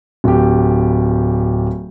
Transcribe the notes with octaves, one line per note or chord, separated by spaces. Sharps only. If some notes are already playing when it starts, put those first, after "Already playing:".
D1 G4